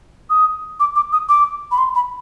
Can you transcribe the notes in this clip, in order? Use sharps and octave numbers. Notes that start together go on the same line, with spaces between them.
D#6
D6
D6
D#6
D6
B5
C6
B5